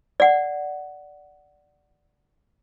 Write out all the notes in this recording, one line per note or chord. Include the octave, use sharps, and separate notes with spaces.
D5 F#5